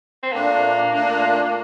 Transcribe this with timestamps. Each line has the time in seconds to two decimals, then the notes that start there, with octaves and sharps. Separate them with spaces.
0.23 C4
0.32 A#2 A3 A#3 D4
0.92 A#2 A3 D4